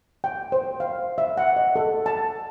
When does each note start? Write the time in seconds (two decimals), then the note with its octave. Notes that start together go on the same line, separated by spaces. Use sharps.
0.24 G5
0.52 C5
0.80 F5
1.18 E5
1.38 F#5
1.57 D#5
1.76 A4
2.06 A5